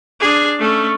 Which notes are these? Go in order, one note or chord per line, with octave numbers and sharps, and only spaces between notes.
D4 G#4
A3 C#4